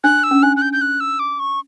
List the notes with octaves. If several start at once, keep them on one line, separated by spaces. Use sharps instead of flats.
D4 F#6
E6
C#4
D4 F#6
F#6
G6
G6
F#6
E6
D6
C#6